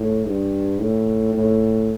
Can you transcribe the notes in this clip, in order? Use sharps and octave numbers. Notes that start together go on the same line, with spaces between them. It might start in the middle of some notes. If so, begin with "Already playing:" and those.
Already playing: A2
G2
A2
A2